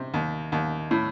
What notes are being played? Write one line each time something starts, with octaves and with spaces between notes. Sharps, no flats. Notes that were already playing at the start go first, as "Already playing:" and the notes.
Already playing: C3
D#2
D#2
A2